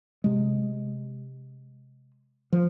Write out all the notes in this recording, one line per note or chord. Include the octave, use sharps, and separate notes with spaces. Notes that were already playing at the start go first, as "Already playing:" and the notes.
C3 G#3
F3